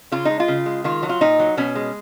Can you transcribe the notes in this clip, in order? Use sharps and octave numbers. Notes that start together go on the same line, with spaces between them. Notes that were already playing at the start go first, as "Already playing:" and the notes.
C#3 F4
G#3 D#4
F4
C#3
G#3
D#3 F4
F#3
F4
A#2 D#4
F#3
B2 C#4
G#3